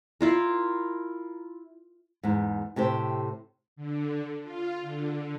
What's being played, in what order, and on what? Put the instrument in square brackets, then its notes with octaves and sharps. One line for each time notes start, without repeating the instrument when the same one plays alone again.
[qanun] E4 F4 A#4
[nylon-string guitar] E2 G#2
A2 C3 G4 C5
[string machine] D3
F4
D3